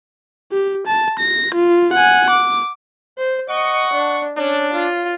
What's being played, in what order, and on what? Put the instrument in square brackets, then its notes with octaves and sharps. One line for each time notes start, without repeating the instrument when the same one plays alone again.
[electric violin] G4
A5
A#6
F4
F#5 G#5
D6
[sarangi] C5
[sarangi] D#5 [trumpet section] F#5 C#6
[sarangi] D4
[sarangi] C#4 [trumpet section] D4
[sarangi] F4